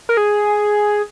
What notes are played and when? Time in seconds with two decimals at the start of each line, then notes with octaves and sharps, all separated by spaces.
0.09 A#4
0.17 G#4